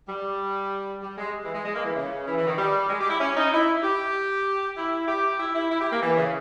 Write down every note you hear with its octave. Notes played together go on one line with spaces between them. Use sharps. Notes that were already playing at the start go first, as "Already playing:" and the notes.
G3
G3
G#3
E3
G#3
G#3
A#3
E3
C#3
E3
E3
D#3
G3
G#3
G4
E4
C#4
D#4
E4
E4
G4
E4
G4
E4
E4
E4
G4
A#3
E3
C#3